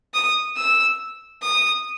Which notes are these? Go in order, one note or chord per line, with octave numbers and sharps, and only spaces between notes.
D#6
E6
D#6